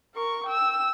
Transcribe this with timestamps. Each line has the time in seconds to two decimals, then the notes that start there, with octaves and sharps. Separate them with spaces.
0.15 A#4 C#6
0.47 G5 E6